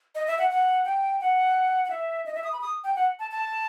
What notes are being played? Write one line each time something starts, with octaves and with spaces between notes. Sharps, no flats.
D#5
E5
F#5
F#5
G5
F#5
F#5
E5
D#5
E5
D#6
B5
D#6
G5
F#5
A5
A5